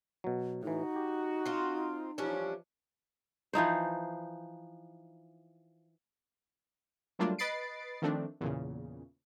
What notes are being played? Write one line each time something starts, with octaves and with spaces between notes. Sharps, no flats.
B2 F#3
A2 E3 D#4 F#4
G4
C4 F4
E3 F3 G3 C#4 D4
E3 F3 D#4 C5
F#3 G3 A3 A#3 D4 F4
B4 D#5 B5 A6 C7 D7
D#3 F3 A3 C4 D4
E2 A#2 C#3